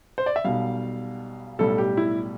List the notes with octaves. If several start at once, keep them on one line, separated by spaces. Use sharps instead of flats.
C5
D5
E5
B1 B2 G3 F5
B1 A2 G3 A4
G4
E4